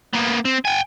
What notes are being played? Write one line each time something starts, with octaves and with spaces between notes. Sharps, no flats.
A#3 B3
C4
G5 G#5